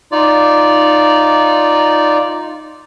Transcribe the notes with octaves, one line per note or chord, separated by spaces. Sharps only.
D#4 F4 D5